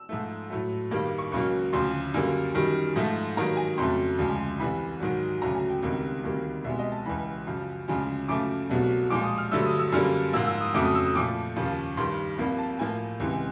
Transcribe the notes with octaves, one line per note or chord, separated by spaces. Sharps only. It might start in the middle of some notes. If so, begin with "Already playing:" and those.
Already playing: E6
G#2 F3 A3
A2 F#3 A3
G2 D#3 G3 A#3
C#6
C#2 C#3 F#3 A#3 C#6
D2 C#3 F3 C6
F#2 D3 G3 A#3
F#2 D#3 G3
G#2 F3 A3
G2 D#3 F#3 A#3 A#5
G#5
F2 C#3 F#3 A3 C6
D2 C#3 F3 G#3
C2 C3 E3 B5
G#2 D#3 F#3
D2 C#3 F#3 A3 A#5
G#5
G5
C#2 C3 D#3 G3 A#3
D2 C3 D#3 G3 A#3
C2 B2 G#3 E5
D#5
A5
C#2 C#3 E3 B5
F#2 C#3 F3
D2 C#3 F3 G#3
F#2 C#3 F3 A3 D6
C2 B2 F#3 A3
A#2 F3 G#3 D6
D#6
F6
G2 D3 F#3 A3 E6
D#6
E6
F#2 D3 G3 A#3 F6
G#2 F3 A#3 E6
E6
D#6
F2 C#3 F#3 A3 D6
D#6
E6
D#6
A#2 F3 A3 D6
D#2 C#3 F3
G2 D#3 G3 C6
C2 C3 F3 A#3 B5
A5
A2 F3 A#3 G#5
C#2 C3 E3 G#3